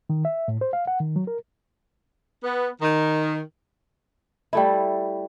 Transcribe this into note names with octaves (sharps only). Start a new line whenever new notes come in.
D#3
E5
A2
C5
F5
F#5
D#3
F#3
A#4
B3
D#3
G3 A3 E4